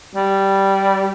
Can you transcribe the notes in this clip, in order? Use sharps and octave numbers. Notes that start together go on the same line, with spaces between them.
G3